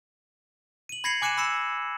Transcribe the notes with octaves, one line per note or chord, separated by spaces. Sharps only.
D#7 F#7
B5 G#6 A#6 C7 C#7 F#7
G#5 D6 F#6 C#7 D#7 E7
B5 E6 A#6 C#7 E7